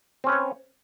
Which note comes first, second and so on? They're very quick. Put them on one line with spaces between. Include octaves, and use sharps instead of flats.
C4 C#4 B4 C#5